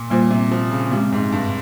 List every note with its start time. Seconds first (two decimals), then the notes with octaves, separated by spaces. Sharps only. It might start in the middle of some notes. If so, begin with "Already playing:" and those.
Already playing: A#2
0.10 A#2 G3 A#3 F4 C5
0.31 C3
0.52 F3
0.71 C#3
0.91 C3 G#3 C#4 G4
1.12 G#2
1.32 G2